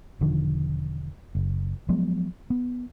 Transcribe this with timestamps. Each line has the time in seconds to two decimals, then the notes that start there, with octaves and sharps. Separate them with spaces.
0.21 E1 D3 D#3 F3
1.35 F#1
1.89 F3 F#3 G#3 B3
2.50 B3